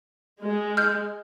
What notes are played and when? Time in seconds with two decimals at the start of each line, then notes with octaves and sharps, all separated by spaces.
0.43 G#3
0.77 F6 G6